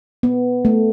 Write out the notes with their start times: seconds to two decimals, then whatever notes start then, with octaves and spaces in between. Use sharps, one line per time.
0.23 B3
0.65 A3